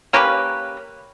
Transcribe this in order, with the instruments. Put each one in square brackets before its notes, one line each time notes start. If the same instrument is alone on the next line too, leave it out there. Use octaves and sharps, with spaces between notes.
[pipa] A#3 C#4 G4 B4